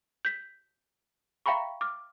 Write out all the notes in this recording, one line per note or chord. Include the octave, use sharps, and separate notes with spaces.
G6 B6
E5 F5 G5 A#5 B5 C#6
D6 F6